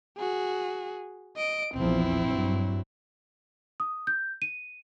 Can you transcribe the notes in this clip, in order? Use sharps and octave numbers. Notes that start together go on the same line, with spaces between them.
F#4 G#4
D#5 D7
A#1 E2 F3 C4 E4
G2 F#3
D#6
G6
D#7